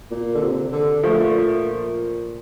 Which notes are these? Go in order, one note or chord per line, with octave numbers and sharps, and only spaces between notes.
A#2
D3
C3
D3
A#2 F3 A3